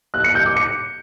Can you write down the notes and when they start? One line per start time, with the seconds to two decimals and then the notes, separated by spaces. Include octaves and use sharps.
0.14 F#6
0.24 C#7
0.35 G6
0.46 D6
0.57 C#7